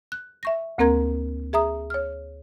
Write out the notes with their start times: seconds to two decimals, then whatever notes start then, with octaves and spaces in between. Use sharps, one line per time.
0.12 F#6
0.43 E5 C#6 A#6
0.78 D2 A#3 C4 A#4 A#5 G#6
1.53 G#4 E5 A#5 D#6
1.90 C#5 F6